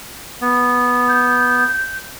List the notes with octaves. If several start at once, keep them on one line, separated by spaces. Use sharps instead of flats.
B3
G6